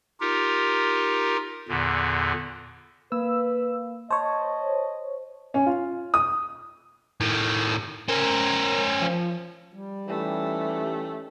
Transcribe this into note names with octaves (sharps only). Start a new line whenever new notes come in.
D#4 F4 G4 A#4
E2 A#2 D3
A#3 B4 E6
C5 C#5 D#5 A5
C#4
F4
D#6
A2 D#3
C#4 A#4 C5
F3
G3
E3 A3 C#4 D#4 G4